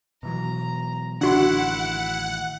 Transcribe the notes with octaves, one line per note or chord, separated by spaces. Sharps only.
B2 E3 F#3 A#5
A1 D3 D#3 D4 E4 F#4 F#5 C6